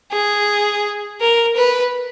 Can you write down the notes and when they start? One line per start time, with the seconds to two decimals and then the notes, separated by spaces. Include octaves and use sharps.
0.12 G#4
1.21 A#4
1.56 B4